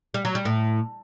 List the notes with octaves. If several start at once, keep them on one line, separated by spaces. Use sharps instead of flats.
G3
F#3
G3
A2